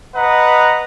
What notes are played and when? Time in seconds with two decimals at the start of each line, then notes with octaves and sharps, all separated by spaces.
0.16 B4 D#5 F#5 A#5